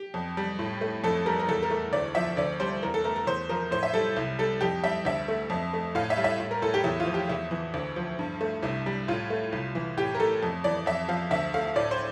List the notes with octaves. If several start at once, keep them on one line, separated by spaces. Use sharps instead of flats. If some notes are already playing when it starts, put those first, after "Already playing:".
Already playing: G4
F2
G3
A2
A3
F2 A4
G3 A#4
A#4
E2 A4
A#4
A3
D2 D5
F3 E5
D2 D5
G3 C5
E2 A#4
A4
A3 A#4
A#4
E2 C5
F3 A#4
A2 C5
E5
G3 A4
C2
G3 A4
F2 G4
G3 E5
D2 E5
A3
F2
A3
A2 F5
E5
G3
E5
A2
A#4
A2 A4
G4
E2 E4
F4
F3
G4
E2 E4
E3
D2
F3
G2
A3
C2 E4
G3
A2 F4
A3
C2
E3
A2 G4
A#4
A3 A4
F2
E3 D5
F2 E5
F3 F5
D2 E5
A3 F5
A2 D5
C5